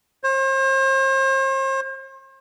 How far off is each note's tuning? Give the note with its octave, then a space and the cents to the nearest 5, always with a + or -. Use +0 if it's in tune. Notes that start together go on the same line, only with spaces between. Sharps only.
C5 +40